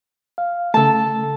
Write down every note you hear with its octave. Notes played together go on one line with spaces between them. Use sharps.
F5
C#3 A3 A4 A5